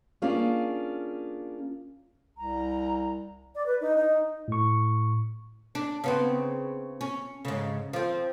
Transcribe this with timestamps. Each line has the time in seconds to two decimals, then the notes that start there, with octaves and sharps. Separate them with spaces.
0.22 A#3 C#4 D4 F4 G#4
2.37 C2 A#5
3.55 D5
3.66 B4
3.81 D#4
3.96 D#4
4.48 A2 C#6
5.75 D4
6.04 C#3 B3 C4
7.01 C#4
7.45 G#2 C#3
7.93 F3 C4